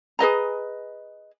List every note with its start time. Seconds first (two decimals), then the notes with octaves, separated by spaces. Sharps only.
0.19 G#4 B4 D#5 A#5